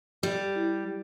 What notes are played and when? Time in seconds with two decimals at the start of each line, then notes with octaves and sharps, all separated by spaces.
0.23 G3 G4
0.56 E4